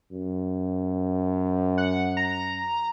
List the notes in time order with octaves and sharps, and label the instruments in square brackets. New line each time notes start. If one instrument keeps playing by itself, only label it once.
[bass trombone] F#2
[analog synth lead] F#5
A#5